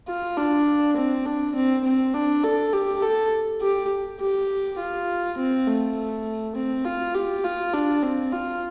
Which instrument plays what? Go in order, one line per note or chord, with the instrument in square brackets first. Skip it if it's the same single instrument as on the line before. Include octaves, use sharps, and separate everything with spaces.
[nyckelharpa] F4
D4
C4
D4
C4
C4
D4
A4
G4
A4
G4
G4
F4
C4
A3
C4
F4
G4
F4
D4
C4
F4